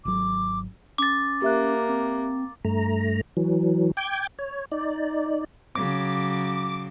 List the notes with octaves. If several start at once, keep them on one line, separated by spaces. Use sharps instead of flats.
G#1 F#3 D6
C#4 D6 A6
A#3 G4 E5 F#6
C4
G2 A3 A#5
E3 F#3
G5 D6 G6 G#6
C#5
D#4 D5
C#3 F#3 D6